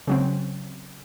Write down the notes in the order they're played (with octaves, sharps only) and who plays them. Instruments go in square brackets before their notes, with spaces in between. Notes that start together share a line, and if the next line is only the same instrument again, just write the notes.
[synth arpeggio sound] C#3 F#3 C4